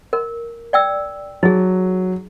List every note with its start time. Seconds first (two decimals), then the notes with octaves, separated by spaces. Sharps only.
0.13 A#4
0.73 D5 G5 E6
1.43 F#3 D#4 G#4